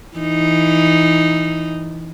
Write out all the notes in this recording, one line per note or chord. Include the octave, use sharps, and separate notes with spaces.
E3 D#4